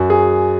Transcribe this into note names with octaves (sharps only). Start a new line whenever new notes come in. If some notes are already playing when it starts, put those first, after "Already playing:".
Already playing: F#2 F#4
G#4